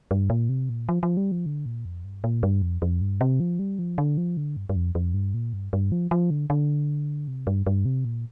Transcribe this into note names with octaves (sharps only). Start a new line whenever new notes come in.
G2
A#2
C3
A#2
F3
F3
G3
F3
D3
A#2
F2
G2
A#2
G2
F2
F2
G2
C3
F3
G3
F3
D3
F3
D3
G2
G2
F2
F2
G2
A#2
G2
G2
F3
F3
D3
D3
C3
G2
G2
C3
A#2